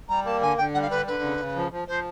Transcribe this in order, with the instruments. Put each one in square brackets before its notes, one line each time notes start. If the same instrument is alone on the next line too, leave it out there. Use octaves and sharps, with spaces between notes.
[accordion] G3 [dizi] A#5
[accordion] A#3 [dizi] A5
[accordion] D3 [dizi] G#5
[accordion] D3 [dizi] G5
[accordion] G3 [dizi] F#5
[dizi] F5
[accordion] D3 [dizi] B4
[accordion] D3 [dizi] B4
[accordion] C#3
C#3
F3
F3
[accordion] F3 [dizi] C5